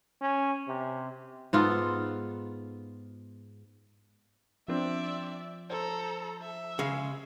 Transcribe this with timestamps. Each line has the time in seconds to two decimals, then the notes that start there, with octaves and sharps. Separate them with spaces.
0.22 C#4
0.68 C3
1.53 G#2 B3 F4 A4
4.68 F3 C4 D4 D5 E5
5.70 A4 C5 A#5
6.42 E5
6.79 C#3 G#3